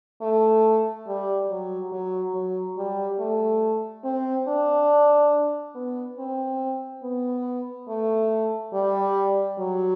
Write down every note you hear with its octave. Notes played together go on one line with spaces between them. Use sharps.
A3
G3
F#3
F#3
F#3
G3
A3
C4
D4
B3
C4
B3
A3
G3
F#3